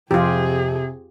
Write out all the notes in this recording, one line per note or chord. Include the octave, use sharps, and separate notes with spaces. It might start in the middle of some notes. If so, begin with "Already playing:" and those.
F2 C3 C4 F4 G4 G#4